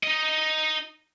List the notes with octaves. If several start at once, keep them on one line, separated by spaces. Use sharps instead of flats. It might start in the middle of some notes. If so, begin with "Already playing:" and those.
D#4 D#5